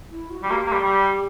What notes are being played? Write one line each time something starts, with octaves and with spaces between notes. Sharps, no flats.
E4
F#4
G3
A#3 G4
A#3
G3
G3